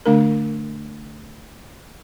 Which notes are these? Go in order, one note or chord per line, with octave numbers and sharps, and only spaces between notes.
D3 A3 D4 A#4